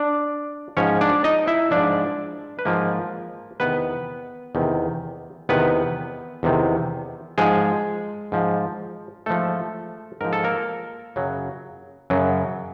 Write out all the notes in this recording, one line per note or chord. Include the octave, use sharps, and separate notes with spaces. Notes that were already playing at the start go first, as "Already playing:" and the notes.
Already playing: D4 D5
G#2 F3 C#4 C#5
D4 D5
D#4 D#5
E4 E5
G#2 F3 D4 D5
B4
G#2 F3 A#3 A#4
E2 C3 D#3 B3 B4
E2 C3 D#3
E2 C3 D#3 B3 B4
E2 C3 D#3
G#2 F3 G#3 G#4
G#2 F3
G#2 F3 A3 A4
G#2 F3 A#4
A4
A#3 A#4
F#2 C#3 F#3
F#2 C#3 F#3